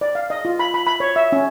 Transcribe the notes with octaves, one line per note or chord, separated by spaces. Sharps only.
D5
F5
D#5
F4
B5
B5
B5
C#5
E5
C#4